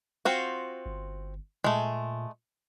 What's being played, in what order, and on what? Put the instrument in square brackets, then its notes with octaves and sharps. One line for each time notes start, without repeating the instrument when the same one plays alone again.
[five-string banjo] C4 F4 F#4
[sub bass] G1
[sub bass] A#2 [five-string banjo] G#3 A3